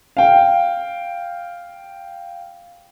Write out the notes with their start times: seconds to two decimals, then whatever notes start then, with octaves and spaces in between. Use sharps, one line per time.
0.17 F5 G5